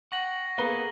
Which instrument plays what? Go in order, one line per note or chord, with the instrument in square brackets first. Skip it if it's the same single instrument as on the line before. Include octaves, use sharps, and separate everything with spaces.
[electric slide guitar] F#5 G5 [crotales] C#6 A#6 F#7
[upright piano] A#3 B4 G7 [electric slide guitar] B3 G#4 A4